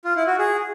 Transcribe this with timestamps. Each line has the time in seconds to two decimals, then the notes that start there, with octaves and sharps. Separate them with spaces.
0.05 F4
0.16 E4
0.27 F#4
0.39 G#4